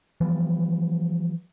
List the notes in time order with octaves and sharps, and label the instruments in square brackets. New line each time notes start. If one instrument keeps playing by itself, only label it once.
[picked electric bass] E3 F3 G3 B3